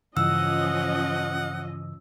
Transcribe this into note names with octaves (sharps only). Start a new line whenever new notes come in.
G2 C#3 E3 F3 C#4 D#5 F#5 E6